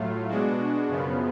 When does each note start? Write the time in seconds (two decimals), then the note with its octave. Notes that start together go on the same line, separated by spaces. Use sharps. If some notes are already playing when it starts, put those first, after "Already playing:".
Already playing: A2 F#3 A3 F4
0.28 B2 G#3 D4 F#4
0.88 F#2 C#3 F3 B3